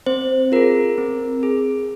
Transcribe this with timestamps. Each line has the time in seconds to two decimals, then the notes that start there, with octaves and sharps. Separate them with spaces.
0.06 C4 C5
0.52 F4 G#4 A#4
0.98 C4
1.43 G#4